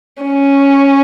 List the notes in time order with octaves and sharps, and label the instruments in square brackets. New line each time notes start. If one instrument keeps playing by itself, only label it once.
[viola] C#4